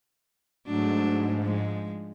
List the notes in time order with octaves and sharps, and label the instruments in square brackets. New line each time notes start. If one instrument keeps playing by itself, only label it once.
[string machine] G#2 [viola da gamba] F#3 A3 D4
[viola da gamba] F3 G#3